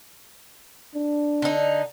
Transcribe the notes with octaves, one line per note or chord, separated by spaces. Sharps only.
D4
D3 D#4